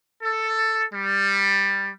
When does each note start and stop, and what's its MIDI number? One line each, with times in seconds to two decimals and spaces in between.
0.23 0.83 69
0.93 1.90 55